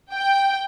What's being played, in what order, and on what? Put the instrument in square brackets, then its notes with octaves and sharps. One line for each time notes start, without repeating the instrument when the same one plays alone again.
[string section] G5